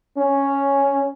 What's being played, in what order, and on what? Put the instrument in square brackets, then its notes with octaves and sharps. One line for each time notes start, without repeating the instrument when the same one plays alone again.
[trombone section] C#4